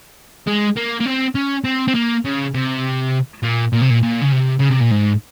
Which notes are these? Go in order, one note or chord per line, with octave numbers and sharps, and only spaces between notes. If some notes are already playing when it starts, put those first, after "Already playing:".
G#3
A#3
A#3
C4
C#4
C4
C4
A#3
C#3
C3
A#2
A#2
C3
A#2
A#2
C#3
C3
C#3
C3
A#2
G#2